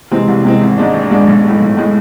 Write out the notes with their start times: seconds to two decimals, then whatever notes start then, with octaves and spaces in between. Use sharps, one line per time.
0.11 C3 E3 G#3 C4
0.27 C2
0.44 C3 E3 G#3 C4
0.61 G#1
0.77 G#2 G#3 D4
0.94 G#1
1.11 G#2 G#3 D4
1.27 B1
1.44 A2 G#3
1.60 B1
1.77 A2 G#3